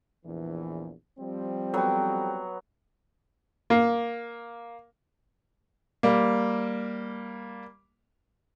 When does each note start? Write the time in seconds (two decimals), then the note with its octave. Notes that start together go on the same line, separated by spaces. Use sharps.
0.24 A#1 E2 E3
1.18 F3 G3 C4
1.74 F#3 B3 A4 G5
3.70 A#3
6.03 G3 A#3